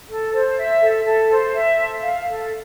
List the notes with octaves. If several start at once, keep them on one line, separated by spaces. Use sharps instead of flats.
A4
C5
E5
A4
A4
C5
E5
A4
F5
A4